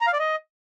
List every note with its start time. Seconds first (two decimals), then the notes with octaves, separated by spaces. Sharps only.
0.01 A#5
0.07 F5
0.13 D5
0.19 D#5